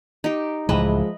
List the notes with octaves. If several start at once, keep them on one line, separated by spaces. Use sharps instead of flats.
D#4 G4
C#2 A2 E3 F3 G#3 B4 D#5 E5